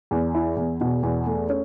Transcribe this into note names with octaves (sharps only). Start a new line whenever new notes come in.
E2
E4
E2
B2
E2
A3
C#4